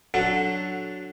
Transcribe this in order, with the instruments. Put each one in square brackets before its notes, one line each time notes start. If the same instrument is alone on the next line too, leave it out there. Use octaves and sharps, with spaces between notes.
[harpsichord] D3 F#3 F#4 A4